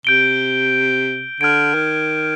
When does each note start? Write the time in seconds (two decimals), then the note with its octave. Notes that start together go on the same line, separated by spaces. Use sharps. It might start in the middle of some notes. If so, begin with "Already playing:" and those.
0.05 C3 G6 D7 G7
1.40 D3 F6 G#6 D7
1.74 D#3